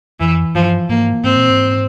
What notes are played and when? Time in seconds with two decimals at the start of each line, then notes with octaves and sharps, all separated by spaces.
0.20 F2 E3
0.55 G2 F3
0.89 G#2 A#3
1.24 G#2 C4
1.36 A#2
1.49 G#2